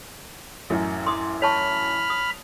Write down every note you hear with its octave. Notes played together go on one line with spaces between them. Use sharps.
A1 F#2
C6 D6 D#6
C#5 A5 B5 C#6 F6
D#6